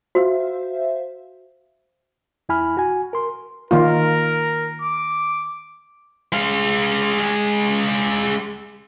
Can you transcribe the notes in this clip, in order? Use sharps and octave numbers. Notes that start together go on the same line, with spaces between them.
F#4 C5 E5 F5
E2 E4 G#5 B5 F6
F#4 G#5
A#4 C6
D#3 A#3 F4 A#4
D6
G#3 F5